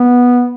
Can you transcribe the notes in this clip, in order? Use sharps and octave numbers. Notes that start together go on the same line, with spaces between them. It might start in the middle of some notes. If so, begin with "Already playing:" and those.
Already playing: B3